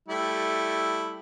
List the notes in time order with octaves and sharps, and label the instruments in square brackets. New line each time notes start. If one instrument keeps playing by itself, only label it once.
[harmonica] G3 A3 E4